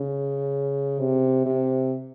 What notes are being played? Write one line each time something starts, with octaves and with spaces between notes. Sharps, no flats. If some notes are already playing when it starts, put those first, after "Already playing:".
Already playing: C#3
C3
C3